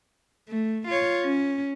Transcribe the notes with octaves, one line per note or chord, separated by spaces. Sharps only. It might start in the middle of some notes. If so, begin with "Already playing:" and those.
A3
F4 C#5
C#4